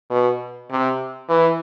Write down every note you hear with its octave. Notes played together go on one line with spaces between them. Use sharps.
B2
C3
E3